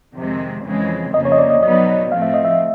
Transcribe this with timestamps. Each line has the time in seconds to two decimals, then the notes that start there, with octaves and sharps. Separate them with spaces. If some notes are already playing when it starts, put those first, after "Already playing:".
0.15 F2 C3 D#3 G#3 C4
0.64 F2 C#3 E3 G#3 C4
1.13 F2 C#3 F3 A#3 D#5
1.25 C#5
1.32 D#5
1.38 D5
1.50 D#5
1.63 B2 F#3 B3 D#4 D#5
2.12 A2 F3 A3 C4 F5
2.22 E5
2.34 D#5
2.45 E5